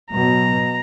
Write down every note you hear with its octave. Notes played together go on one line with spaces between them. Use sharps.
B2 F#3 A#5